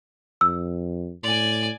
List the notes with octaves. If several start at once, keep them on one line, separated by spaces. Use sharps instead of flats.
F2 E6
A2 D5 G#5